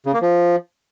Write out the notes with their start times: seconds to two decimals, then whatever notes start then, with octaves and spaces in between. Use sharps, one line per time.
0.06 C#3
0.14 A#3
0.22 F3